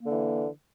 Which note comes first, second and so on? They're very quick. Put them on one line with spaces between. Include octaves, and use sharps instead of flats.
A#3 D3 E3